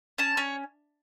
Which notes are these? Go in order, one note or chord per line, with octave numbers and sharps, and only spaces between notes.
C#4 A5
C#4 C#5